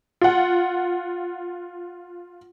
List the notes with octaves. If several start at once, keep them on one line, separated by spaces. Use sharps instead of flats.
F4 F#5